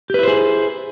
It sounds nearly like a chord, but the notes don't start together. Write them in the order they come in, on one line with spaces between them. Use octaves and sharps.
G4 B4 E4 C5 G#4